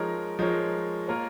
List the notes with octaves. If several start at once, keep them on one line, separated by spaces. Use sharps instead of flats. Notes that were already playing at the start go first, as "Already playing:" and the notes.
Already playing: F3 G#3 D#4 A#4 C#5
F3 G#3 D#4 A#4 C#5
A#3 F4 A#4 C#5